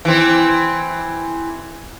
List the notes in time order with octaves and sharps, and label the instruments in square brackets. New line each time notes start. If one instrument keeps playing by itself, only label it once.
[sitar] E3 C4